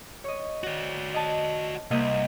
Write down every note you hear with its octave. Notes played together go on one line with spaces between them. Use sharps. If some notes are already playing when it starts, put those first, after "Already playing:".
C#5 D#5
F#4 D5
D#5 A5
C2 C3 A#3 D#5